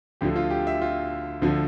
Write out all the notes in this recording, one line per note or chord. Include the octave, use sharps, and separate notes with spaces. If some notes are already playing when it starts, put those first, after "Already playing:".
D2 D3 F3 G4
F4
G4
E5
F4
D2 D3 F3